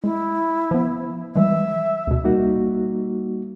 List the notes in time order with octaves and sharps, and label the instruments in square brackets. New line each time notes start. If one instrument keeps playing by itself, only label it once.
[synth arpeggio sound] G#3 [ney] E4
[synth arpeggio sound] F3 B3
[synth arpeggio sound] E3 G3 G#3 [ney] E5
[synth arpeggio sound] D2 B2
[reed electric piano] G3 A#3 D#4 F#4